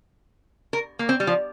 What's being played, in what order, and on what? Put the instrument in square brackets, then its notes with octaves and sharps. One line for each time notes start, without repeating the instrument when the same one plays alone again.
[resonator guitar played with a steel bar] A#4
A#3
C4
G3
F3